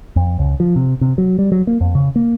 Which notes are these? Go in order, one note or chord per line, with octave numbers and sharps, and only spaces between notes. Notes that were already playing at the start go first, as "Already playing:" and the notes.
F2
C#2
F3
C3
C3
F#3
G3
F#3
A#3
F2
C#3
A#3